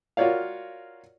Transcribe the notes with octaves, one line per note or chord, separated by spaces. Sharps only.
F4 F#4 A#4 C#5 D5 F5